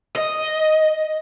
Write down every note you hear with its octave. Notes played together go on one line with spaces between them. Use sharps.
D#5